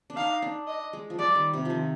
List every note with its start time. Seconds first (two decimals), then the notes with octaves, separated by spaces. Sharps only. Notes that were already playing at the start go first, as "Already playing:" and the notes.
0.10 D4
0.17 D#4 F5
0.42 D4
0.67 D#5
0.93 G#3
1.10 F3
1.19 G3 D5
1.35 D#3
1.53 C3
1.65 D#3 F3